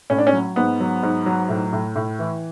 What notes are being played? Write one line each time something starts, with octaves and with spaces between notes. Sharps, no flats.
A2 C#4
D4
C#4
F#3
G#2 B3
F#3
G#2
F#3
A2
A2
A2
E3